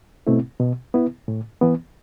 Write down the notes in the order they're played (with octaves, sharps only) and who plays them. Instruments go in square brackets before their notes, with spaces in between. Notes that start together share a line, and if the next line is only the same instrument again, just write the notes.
[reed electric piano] B2 A3 C4 E4
B2
B3 E4
A2
E3 B3